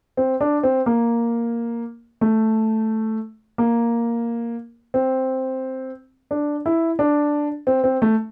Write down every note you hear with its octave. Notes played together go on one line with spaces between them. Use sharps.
C4
D4
C4
A#3
A3
A#3
C4
D4
E4
D4
C4
C4
A3